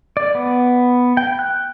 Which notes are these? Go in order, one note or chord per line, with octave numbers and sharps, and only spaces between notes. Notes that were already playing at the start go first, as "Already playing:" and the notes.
D5
B3
G5
F#6